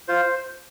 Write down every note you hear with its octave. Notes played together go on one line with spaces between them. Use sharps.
F4 C5